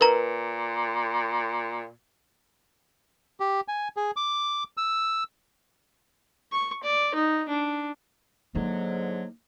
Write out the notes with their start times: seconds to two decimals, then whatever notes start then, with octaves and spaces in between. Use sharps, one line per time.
0.01 A#2 A#4 B4 A#5
3.40 G4
3.68 G#5
3.97 G#4
4.16 D6
4.77 E6
6.52 C#6
6.84 D5
7.15 D#4
7.49 D4
8.55 G#2 D3 F#3 A#3 D#4